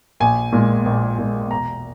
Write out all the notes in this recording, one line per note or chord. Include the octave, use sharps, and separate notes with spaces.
A#1 G#5
A#2 G#3
A#1
A#2 G#3
E1 A#5